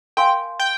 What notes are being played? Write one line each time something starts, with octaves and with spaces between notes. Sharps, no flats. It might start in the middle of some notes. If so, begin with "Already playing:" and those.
A#4 F5 G5 G#5 C6
G5